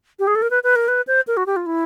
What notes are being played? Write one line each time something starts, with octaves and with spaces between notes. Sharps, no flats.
G4
G#4
A4
A#4
B4
B4
A#4
B4
C5
A#4
F#4
G4
F4
E4